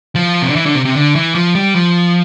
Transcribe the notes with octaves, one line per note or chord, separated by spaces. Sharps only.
F3
C3
D3
E3
D3
C3
C3
D3
E3
F3
G3
F3